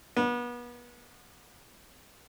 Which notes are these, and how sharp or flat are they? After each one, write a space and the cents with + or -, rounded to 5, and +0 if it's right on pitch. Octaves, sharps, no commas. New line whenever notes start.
B3 -30